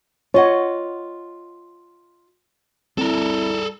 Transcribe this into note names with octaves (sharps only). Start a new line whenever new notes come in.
F4 C#5 D#5 F#5
G3 C4 E4 A4 A#4